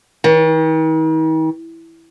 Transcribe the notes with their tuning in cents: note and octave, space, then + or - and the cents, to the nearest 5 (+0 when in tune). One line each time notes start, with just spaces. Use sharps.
D#3 +45